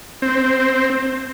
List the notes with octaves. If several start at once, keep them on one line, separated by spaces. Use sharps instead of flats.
C4